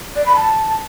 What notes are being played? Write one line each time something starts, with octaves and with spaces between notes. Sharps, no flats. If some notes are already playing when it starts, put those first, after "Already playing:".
D5
B5
A5